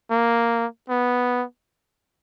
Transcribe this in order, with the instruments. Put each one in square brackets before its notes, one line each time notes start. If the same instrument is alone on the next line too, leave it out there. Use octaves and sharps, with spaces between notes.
[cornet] A#3
B3